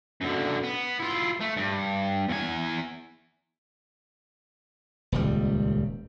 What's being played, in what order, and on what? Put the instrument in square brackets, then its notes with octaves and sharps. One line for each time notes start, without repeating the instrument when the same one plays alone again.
[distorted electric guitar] F#2 D3
B3
E4 F4
A3
G2
E2 G#5
[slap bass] D#1 C#2 G3